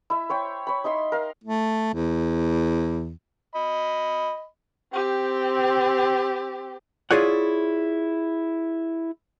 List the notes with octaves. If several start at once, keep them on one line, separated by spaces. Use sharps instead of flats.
E4 E5
C5 C#5 G5
C#5 B5
D#4 D#5 E5 C6
A#4 F5
A3
E2
D#5 B5
C4 G4
E4 F4 G#4 C#5 D5 F#5